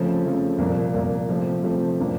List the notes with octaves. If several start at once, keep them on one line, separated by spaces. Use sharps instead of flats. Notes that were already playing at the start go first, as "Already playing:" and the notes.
Already playing: C#3 F3 A3 C4
C#3 F3 A3 C4
C2 A#2 F3 A#3
C2 A#2 F3 A#3
C3 F3 A3 C4
C3 F3 A3 C4
A2 F3 A#3 D4